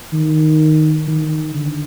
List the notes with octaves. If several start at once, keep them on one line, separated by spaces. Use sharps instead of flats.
D#3
D#3
D3